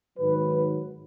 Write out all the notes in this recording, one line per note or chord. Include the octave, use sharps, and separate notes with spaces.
G#2 D#3 F#3 B4